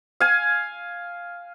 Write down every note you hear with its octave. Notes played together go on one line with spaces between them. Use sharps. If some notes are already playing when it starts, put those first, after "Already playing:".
F5 G#5